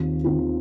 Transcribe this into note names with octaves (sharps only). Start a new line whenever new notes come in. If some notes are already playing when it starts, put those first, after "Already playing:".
Already playing: D#2 D#3 C4 F4
D#2 D#3 C4 F4